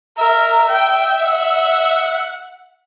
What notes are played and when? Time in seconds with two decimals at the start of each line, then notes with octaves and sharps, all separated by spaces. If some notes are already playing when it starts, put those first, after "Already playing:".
0.18 A#4 E5
0.69 G5
1.23 F#5